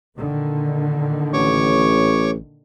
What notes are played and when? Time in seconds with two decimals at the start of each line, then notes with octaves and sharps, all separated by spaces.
0.18 A#2 D3 D#3
1.33 A1 C#5 C#6 D6